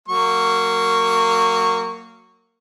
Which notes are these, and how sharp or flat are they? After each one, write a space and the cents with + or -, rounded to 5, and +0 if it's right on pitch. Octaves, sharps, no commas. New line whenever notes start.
F#3 +0 A#3 -20 C#6 +0